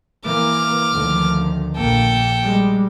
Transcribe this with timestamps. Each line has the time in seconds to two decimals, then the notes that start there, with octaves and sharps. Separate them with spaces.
0.25 E3 A#3 D6 F6
0.93 D2 D#3 F3
1.76 A#1 A#3 A4 G5
2.43 G3 G#3